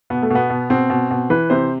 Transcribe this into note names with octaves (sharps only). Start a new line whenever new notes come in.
B2 B3
A3
B2 B3
B2
B2 C4
B2
B2
E3 B4
C3 C5